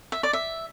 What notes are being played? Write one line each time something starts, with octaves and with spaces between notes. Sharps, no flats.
E5
D5
E5